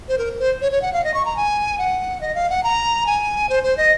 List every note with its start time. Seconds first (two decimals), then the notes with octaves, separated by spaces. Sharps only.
0.09 C5
0.18 A#4
0.39 C5
0.62 C#5
0.72 C#5
0.82 F#5
0.93 F5
1.04 D#5
1.14 C#6
1.25 A#5
1.36 G#5
1.78 F#5
2.21 D#5
2.35 F5
2.50 F#5
2.64 A#5
3.07 G#5
3.49 C5
3.64 C5
3.77 D#5